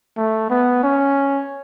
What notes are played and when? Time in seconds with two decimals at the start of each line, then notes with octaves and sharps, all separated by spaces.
0.17 A3
0.50 B3
0.83 C#4